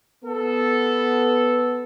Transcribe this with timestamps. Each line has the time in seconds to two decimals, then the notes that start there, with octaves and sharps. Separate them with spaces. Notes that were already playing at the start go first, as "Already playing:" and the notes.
0.24 B3 A4